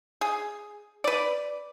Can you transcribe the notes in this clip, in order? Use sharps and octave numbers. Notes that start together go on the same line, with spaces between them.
G#4
B4 D5